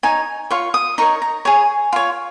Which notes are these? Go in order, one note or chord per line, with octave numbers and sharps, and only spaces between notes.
D#4 C#5 G#5
F4 C#5 C#6
D#6
D#4 A#4 C#5 C#6
A#5
G#4 C#5 G#5
F4 C#5